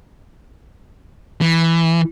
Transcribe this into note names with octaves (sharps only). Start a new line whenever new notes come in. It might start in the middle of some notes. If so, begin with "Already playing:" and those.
E3